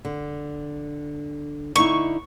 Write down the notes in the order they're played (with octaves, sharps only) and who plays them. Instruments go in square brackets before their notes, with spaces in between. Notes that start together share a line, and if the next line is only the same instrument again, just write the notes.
[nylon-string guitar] D3
[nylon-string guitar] D3 D#4 E4 [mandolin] C#6